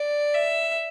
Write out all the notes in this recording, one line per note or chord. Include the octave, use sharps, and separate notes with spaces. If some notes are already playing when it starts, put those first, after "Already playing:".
Already playing: D5
E5